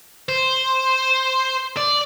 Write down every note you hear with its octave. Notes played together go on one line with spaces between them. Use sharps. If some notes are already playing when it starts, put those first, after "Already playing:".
C5
D5